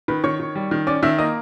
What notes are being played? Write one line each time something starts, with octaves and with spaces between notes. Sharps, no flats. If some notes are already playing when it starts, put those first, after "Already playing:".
D#3 B4 B5
D#3 C#5 C#6
D#3
G3
D#3
C#4 D5 D6
D#3 E5 E6
A#3 D#5 D#6